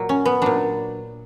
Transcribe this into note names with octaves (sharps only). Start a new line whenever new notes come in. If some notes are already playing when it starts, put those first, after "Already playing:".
Already playing: A#2 F#3
C#4
B3
A#2 F#3 D4